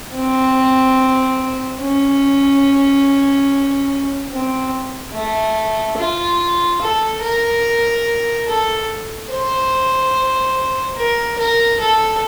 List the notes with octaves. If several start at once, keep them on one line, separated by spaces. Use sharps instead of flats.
C4
C#4
C4
A3
F4
A4
A#4
A4
C5
A#4
A#4
A4